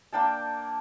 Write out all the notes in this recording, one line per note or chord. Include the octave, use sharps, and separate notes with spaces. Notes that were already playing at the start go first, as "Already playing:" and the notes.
A#3 D4 G5 A5